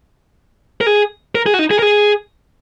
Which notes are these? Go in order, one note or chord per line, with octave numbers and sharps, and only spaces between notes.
A#4
G#4
A#4
G#4
F#4
D#4
G#4
A#4
G#4